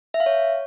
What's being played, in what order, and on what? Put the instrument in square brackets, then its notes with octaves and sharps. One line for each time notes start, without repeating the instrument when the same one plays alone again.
[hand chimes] E5
F5
C#5